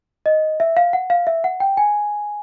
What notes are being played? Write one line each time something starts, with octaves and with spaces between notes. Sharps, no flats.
D#5
E5
F5
F#5
F5
E5
F#5
G5
G#5